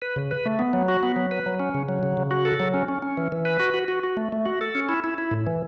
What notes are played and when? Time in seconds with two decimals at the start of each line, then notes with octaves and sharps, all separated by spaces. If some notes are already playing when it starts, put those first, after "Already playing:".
0.02 B4
0.16 C#3
0.31 B4
0.46 A3
0.59 B3
0.73 F#3
0.88 F#4
1.03 B3
1.16 F#3
1.31 B4
1.46 F#3
1.59 C#4
1.74 C#3
1.89 F#3
2.03 C#3
2.17 C#3
2.31 F#4
2.45 A4
2.60 F#3
2.74 C#4
2.88 C#4
3.02 C#4
3.17 E3
3.32 E3
3.45 B4
3.60 F#4
3.74 F#4
3.88 F#4
4.03 F#4
4.17 A3
4.32 A3
4.45 F#4
4.61 A4
4.75 C#4
4.89 E4
5.04 E4
5.18 E4
5.31 A2
5.47 E3